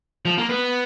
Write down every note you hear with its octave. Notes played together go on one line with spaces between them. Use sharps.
F3
A#3
B3